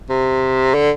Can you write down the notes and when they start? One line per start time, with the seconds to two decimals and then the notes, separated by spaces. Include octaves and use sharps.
0.10 C3
0.74 D3